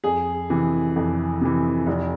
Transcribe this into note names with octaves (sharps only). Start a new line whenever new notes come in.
F2 G#4
C3 E3
F2
C3 E3
F1